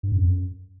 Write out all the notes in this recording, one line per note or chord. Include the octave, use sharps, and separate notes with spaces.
G2
F#2
F2
F#2